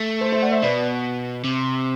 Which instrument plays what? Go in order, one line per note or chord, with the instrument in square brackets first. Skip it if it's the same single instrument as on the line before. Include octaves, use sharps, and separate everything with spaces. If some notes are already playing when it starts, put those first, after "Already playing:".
Already playing: [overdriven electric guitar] A3
[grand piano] A4 C5
C5 E5
D5 F#5
C5 E5
[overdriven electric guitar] B2 [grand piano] B4 D5
[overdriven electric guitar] C3